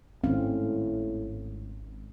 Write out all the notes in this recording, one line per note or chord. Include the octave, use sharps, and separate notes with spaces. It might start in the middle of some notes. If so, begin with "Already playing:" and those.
G#1 A2 C4 C#4 F5